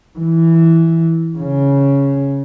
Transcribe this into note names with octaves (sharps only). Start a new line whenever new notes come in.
E3
C#3